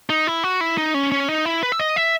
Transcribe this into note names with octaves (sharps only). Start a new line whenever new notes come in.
D#4
E4
F#4
E4
D#4
C#4
C#4
D#4
E4
B4
E5
D#5
E5